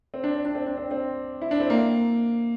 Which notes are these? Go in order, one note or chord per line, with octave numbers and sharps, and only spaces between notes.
C4
D4
C4
D4
C4
D4
C4
C4
E4
D4
C4
A#3